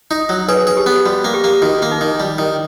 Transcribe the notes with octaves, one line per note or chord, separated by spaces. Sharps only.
D#4
F#3
G#4 B4 C#5
G#4
G4
B3
G3 F#4
A#3
G4
A#3
D#3 F#4
A#3
D#4
D#3
G3
D#3